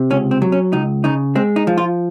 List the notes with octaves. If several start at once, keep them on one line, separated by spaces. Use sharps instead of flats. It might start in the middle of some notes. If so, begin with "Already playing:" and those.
Already playing: C3
C#2 C#4
C4
F#3
C#4
C#2 D#4
C#3 D#4
G#3 C4
D#4
F3
F4